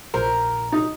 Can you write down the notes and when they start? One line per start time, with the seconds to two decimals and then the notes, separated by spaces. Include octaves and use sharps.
0.14 A#1 A#4 C5
0.72 D#4